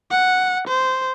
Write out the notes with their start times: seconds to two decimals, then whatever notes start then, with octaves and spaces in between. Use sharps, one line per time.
0.11 F#5
0.68 C5